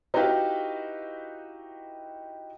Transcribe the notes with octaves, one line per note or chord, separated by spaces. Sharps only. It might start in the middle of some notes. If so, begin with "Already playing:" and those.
D#4 E4 F#4 G4 B4 F5